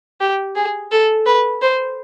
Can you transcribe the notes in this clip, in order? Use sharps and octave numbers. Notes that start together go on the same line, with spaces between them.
G4
G#4
A4
B4
C5